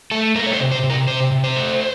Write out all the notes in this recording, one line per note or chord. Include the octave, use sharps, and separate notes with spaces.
A3 A4
A3 A#4
C#5
C5
C3
C5
C3
A#4
C3 C5
C3
C5
A3